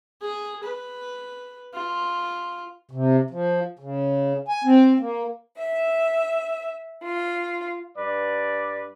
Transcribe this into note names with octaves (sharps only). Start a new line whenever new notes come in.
G#4
B4
F4
C3
F3
C#3
G#5
C4
A#3
E5
F4
G2 B4 D5